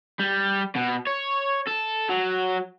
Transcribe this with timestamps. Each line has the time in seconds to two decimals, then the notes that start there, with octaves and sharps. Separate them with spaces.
0.20 G3
0.76 B2
1.07 C#5
1.67 A4
2.09 F#3